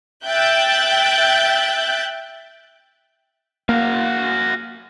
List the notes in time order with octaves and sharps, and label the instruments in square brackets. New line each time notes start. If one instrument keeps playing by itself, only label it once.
[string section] E5 G5 F#6 G6 A6
[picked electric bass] A#3 [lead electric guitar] F#4 F5